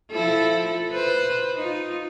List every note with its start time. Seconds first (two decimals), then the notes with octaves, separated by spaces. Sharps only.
0.12 F3 E4 A4
0.92 B4 C5
1.56 D#4 F4